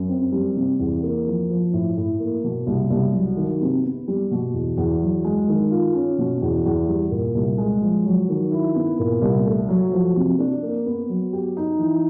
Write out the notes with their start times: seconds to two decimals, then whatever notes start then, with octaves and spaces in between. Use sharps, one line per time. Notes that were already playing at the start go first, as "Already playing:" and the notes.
Already playing: F#2
0.09 C4
0.32 G3
0.56 C3
0.80 E2
1.03 A#3
1.27 F3
1.50 F3
1.73 A2
1.97 A2
2.20 A#3
2.44 B2
2.67 C2
2.90 C2
3.13 F#3
3.37 D#3
3.61 C3
3.84 B3
4.08 G3
4.31 B2
4.54 E2
4.77 E2
5.02 F#3
5.25 G#3
5.48 D#3
5.71 F4
5.94 C#4
6.18 B2
6.42 E2
6.65 E2
6.88 G3
7.11 A#2
7.35 C2
7.58 G#3
7.82 F3
8.06 F#3
8.29 D#3
8.51 E4
8.75 B3
8.99 A#2
9.22 C2
9.46 A3
9.69 F#3
9.92 F3
10.16 C3
10.39 D4
10.63 A#3
10.86 B3
11.09 F#3
11.33 G4
11.57 D#4
11.79 E3